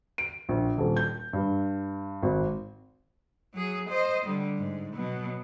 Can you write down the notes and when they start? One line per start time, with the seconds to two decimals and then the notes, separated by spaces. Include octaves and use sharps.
0.18 D7
0.49 A#1
0.78 D#1
0.97 G6
1.33 G2
2.23 G#1
3.54 F#3 G#4
3.90 C5 D#5
4.26 D3 G3
4.57 G#2
4.94 B2 F#3